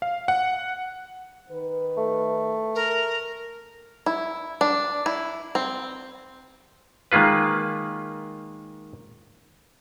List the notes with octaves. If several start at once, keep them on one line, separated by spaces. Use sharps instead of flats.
F5
F#5
D#3 B4
A3
A#4
E4
D4
E4
C4
D#3 G#3 A#3 F4 B4